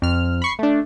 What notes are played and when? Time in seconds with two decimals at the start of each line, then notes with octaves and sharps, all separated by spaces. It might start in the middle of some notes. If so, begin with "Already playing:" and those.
0.02 F2 F6
0.42 B5 C#6 C7
0.59 A3 D4